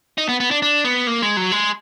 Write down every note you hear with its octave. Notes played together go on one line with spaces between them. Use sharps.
D#4
B3
B3
D4
D4
B3
A#3
G#3
F#3
G#3